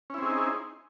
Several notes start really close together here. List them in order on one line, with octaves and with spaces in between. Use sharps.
C#4 E4 C4 G#4 D#4